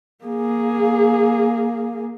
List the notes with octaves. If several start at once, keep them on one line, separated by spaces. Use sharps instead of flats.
A#3 G#4